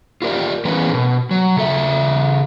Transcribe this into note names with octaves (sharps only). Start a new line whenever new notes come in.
F4 G4 A#4 D5
E3 B3 C#4 G#4 A#4 B4
B2
F#3
C#3 A4 E5